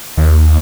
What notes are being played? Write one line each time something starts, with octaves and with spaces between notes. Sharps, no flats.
D#2